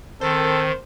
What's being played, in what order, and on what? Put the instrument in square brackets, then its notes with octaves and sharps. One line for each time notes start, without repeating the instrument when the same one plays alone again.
[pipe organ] D#3 [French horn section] C4 A#4 [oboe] A4 [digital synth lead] C5